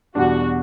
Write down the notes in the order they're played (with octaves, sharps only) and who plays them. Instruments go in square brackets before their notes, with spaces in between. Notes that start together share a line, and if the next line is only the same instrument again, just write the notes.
[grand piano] E2 B2 G3 D4 [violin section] F#4